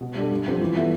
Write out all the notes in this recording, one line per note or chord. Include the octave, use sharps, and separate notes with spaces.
B2
G3 D4 A4
G2
F3 C4 G4
E3
B3 E4 A4